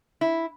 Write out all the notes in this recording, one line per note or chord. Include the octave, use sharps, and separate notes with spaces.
E4